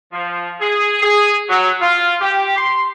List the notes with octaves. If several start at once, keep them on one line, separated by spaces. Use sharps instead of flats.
F3
G#4
G#4
F#3
F4
G4
C6